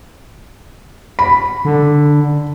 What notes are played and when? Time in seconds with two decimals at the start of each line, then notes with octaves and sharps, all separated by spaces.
1.19 B5
1.65 D3